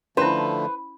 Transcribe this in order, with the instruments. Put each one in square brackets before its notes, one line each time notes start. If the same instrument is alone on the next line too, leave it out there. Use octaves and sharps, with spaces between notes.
[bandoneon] D3 F3 A3 [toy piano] C#4 E4 [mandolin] B4 [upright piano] C5